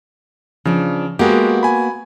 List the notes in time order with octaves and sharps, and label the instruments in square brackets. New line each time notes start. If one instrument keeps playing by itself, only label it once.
[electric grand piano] C#3 [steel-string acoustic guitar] F3 D4
[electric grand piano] G#3 G4 [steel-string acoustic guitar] A#3 B3 F#4
[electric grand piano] G#5 B5